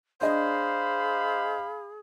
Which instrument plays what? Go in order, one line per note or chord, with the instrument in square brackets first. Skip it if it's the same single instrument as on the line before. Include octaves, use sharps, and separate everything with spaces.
[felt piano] D4 D#5 [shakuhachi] G#4 [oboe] C5 [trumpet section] F5 B5